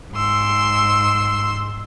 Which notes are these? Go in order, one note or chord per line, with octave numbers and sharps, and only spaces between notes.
G#2 C6 E6